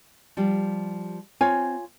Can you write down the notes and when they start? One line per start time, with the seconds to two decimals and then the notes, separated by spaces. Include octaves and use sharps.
0.37 F3 G3 G4
1.41 C4 F4 C#5 G#5